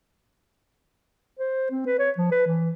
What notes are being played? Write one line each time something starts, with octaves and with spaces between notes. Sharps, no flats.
C5
C4
B4
C#5
F3
B4
E3